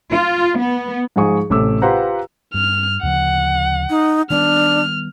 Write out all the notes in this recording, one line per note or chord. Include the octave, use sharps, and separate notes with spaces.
F4
B3
G#2 F3 D#4 G#4 C#6
A1 C3 A3 D6 E6
F4 G4 B4 C5 F#5 A#5
G2 F6
D2 C#3 F3 F#5
D#4
D#3 G3 B3 D4 F6